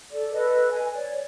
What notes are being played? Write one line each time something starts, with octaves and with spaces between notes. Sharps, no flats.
A4 D5
A4 B4 D#5
G#5
C#5 D5